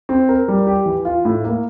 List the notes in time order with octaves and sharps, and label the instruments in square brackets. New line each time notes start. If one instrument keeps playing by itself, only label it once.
[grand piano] C4
A#4
G3
G4
E3
F4
A2
A#3